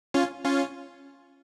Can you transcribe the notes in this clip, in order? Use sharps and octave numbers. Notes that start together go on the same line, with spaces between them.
C#4 F4
C#4 F4